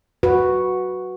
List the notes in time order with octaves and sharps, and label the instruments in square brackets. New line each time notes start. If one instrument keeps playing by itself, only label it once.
[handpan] F#4 B4